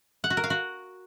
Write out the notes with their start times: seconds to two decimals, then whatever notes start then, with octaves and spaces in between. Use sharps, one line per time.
0.24 F#5
0.30 F#4
0.37 A#4
0.44 F5
0.50 F#4